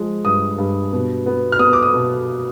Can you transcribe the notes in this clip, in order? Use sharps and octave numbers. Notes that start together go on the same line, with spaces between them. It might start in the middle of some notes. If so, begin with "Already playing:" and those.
Already playing: F3 G#3
G2 D#6
G2
B2
B3
F6
B3 D#6
D6
D#6
B2